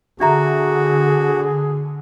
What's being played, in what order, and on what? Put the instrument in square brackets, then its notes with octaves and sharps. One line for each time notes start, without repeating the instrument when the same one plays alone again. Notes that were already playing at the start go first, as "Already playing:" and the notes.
[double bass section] D3 [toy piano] D4 E5 A#5 [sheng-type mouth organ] F#4 [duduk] G#4